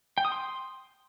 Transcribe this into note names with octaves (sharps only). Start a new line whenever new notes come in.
G5
D#6
C6